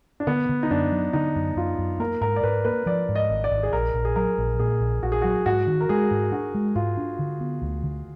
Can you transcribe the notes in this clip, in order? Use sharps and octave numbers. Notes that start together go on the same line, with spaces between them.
D4
D3 B3
D3
D#4
F#2 D4
F#3
D3 D#4
F#2
F#2 F4
F#2
A#3 A#4
G#2 A#4
D5
G#2 B4
A#3 B4
F3 D5
G#2
D#5
G#1
D5
G#1
G#4
A#1 A#4
A#1
G#4
F#3 A#4
A#1
A#2 G#4
A#1
A#1 F#4
G#4
F#3 F#4
G#2 F#4
D#3
A#4
G#3 G#4
G#2
D4 F#4
G#3
G#2 F4
D4
D3
B3
D2
D3